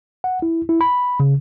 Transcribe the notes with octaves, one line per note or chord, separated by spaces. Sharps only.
F#5
E4
E4
B5
C#3